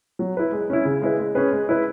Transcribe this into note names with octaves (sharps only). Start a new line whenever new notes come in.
F#3
E4 B4
G#3
C#4 E4
C#3
G#3 E4 B4
G#3
C#4 G#4 B4
G#3
E4 B4